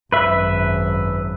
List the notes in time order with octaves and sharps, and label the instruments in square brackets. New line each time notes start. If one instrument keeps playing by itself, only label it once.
[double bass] G#1 F#2 [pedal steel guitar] B4 E5